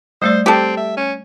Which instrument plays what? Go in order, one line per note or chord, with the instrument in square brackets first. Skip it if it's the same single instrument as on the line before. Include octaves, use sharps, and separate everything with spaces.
[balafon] G3 A3 D5 [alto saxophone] C5
[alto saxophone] C4 [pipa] G4 A4
[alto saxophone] E5
C#4